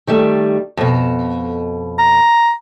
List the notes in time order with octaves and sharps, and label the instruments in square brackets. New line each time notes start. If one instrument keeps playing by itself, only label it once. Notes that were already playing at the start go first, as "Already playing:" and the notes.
[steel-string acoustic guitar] D#3 G3 A3
F2 B2
[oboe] A#5